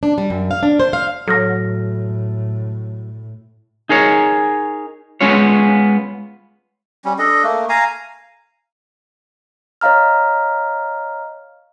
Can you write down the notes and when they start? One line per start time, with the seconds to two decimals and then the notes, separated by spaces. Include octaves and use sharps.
0.03 D4
0.18 G3
0.30 F#2
0.51 F5
0.63 D4
0.80 C5
0.93 F5
1.27 A2 F#3 A4 F6 A#6
3.89 D#4 G#4 A#4 C#5
5.21 G#3 B3 C#4 F4 C#5
7.05 G3 C#4
7.19 D4 A4 D#5
7.43 A3 A#3
7.69 F5 G#5 A#5
9.81 C#5 D#5 F5 A#5 F6